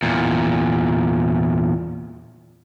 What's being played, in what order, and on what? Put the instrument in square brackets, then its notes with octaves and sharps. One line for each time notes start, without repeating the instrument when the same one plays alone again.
[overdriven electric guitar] E2 A#2